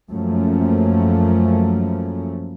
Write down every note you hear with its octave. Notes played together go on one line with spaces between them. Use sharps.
F#2 F3 A3 A#3 C#4